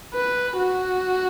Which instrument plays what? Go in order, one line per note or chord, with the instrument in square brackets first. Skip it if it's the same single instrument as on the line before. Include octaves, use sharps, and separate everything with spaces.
[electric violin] B4
F#4